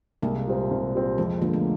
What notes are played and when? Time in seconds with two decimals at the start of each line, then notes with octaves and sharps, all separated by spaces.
0.22 C2 G#3 A#3
0.47 A#2 G3 C4
0.71 C2
0.95 A#2 G3 C4
1.18 F2 G#3
1.41 D3 F3 G#3 A#3
1.54 A3 B3